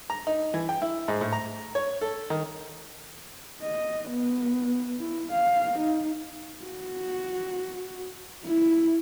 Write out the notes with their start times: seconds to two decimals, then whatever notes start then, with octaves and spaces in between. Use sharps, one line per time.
0.10 A#5
0.27 D#4
0.54 E3
0.69 G5
0.82 E4
1.08 G#2
1.21 A2
1.33 A#5
1.75 C#5
2.01 A4
2.30 D#3
3.62 D#5
4.09 B3
5.00 E4
5.32 F5
5.79 D#4
6.64 F#4
8.45 E4